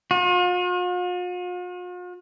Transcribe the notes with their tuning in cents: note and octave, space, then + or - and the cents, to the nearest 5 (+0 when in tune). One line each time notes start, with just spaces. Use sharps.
F4 +45